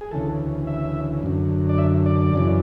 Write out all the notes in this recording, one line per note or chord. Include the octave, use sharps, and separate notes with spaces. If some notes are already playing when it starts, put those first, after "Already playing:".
G#4
D2 C#3 E3 A4
E5
F#2 D3
D5
E5
D5
F#2 C#3 E3